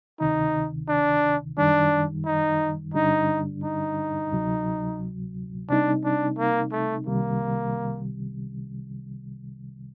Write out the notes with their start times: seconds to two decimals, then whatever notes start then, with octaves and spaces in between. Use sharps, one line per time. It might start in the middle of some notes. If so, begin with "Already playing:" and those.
0.20 D2 C3 D#3 D#4
0.89 D4
1.57 F#2 D#3 G3 D4
2.26 D#4
2.94 G2 D3 G3 D4 D#4
3.64 D#4
4.32 D2 C3 F#3
5.69 C3 G3 C4 D4 D#4
6.04 D4
6.38 A#3
6.72 A3
7.06 C2 C3 D#3 G3 A#3